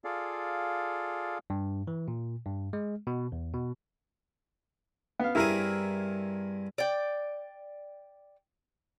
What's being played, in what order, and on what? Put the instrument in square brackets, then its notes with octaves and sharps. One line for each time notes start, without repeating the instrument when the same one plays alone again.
[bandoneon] F4 G#4 A4 D5 F5
[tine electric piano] G2
E3
A#2
G2
G#3
B2
E2
B2
[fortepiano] B3 F5
[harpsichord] G2 C4 G#4 [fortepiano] E4 A#4
[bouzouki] D5 G5